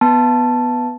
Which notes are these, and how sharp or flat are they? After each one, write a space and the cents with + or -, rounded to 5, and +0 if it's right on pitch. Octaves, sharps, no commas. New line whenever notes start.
B3 +0 A5 +0